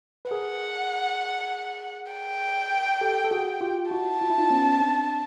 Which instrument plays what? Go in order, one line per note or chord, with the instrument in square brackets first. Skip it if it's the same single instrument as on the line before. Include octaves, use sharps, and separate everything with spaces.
[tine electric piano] B4
[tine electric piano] G#4 A#4 [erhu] F#5
[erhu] G5
[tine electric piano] G4 A4
A4
F#4 G#4
F4 G4
[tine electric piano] E4 F#4 [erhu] A5
[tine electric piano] F4
E4
D#4 F4
B3 C#4
C4 D4